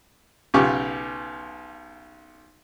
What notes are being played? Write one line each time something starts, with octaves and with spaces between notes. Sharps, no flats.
B1 C#3 F4 G4 C#6 D6